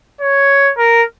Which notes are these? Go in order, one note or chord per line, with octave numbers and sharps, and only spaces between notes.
C#5
A#4